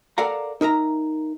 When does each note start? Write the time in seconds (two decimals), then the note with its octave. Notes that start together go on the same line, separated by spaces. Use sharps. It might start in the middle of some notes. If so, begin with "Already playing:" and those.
0.18 A4 A#4 D5 F5 F#5 A#5
0.61 D#4 A#4 E5 A#5